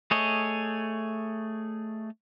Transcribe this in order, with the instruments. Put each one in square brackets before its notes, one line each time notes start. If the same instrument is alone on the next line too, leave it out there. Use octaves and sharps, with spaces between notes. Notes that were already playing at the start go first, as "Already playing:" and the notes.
[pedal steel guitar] A3 G#4 C#5 D#5